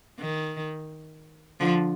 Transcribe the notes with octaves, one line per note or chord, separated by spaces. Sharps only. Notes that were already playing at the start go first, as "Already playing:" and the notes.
D#3
D3 F3